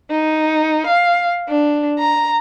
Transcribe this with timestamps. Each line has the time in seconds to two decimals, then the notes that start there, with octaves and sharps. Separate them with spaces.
0.11 D#4
0.86 F5
1.48 D4
1.98 A#5